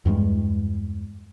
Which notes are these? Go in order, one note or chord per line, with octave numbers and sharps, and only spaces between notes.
E2 G2 G3 G#3